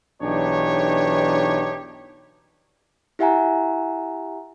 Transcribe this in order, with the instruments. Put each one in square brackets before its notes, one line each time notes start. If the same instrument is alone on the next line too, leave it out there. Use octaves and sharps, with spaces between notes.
[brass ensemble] B1 E3 D4 D#4 G4 C#5
[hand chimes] E4 G4 E5 F#5 G#5 A#5